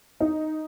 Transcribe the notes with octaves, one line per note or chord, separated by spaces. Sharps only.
D#4